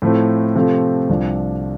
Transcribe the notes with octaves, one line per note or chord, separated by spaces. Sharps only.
A2 F3 A3 C4
C3 F3 A3 C4
C2 C3 F3 D4